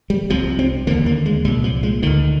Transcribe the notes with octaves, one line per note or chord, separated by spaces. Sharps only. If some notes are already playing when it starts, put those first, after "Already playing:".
G3
C2 C3 F3
C4
D#2 D3 A#3
A#3
G#3
C2 A#2 G3
F3
G#3
D2 D3 D#3